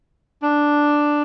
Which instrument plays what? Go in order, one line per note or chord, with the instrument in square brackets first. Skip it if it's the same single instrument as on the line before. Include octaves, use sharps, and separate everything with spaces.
[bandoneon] D4